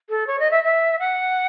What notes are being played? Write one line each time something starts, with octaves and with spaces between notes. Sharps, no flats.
A4
C#5
D#5
E5
E5
F#5